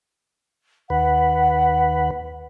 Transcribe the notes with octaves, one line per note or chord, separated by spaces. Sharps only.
D#2 B4 F#5